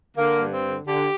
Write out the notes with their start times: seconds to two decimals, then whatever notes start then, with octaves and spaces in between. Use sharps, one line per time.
0.17 D3 A#3
0.40 G2
0.52 C4
0.64 D3
0.88 D3 G4